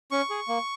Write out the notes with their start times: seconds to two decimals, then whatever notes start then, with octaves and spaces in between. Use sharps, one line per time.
0.11 C#4 C#6
0.30 G#4
0.48 A#3